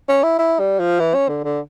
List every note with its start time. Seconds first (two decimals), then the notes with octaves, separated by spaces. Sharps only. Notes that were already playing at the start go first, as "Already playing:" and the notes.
0.09 C#4
0.23 E4
0.39 E4
0.59 G3
0.79 F3
0.99 E3
1.14 C#4
1.28 D3
1.44 D3